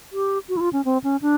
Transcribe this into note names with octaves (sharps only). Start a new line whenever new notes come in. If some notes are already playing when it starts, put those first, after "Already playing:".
G4
F#4
E4
F4
C#4
C4
C#4
D4